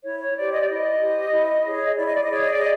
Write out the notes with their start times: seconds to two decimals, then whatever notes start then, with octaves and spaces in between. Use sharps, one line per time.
0.03 E4 C#5
0.20 C#5
0.36 G4 C5 D5
0.52 D#5
0.62 D5
0.68 E4 D#5
1.00 G4 C5
1.32 E4
1.64 G#4 C#5
1.97 E4 D5
2.07 D#5
2.15 D5
2.24 D#5
2.30 G#4 C#5 D5
2.41 D#5
2.50 D5
2.59 D#5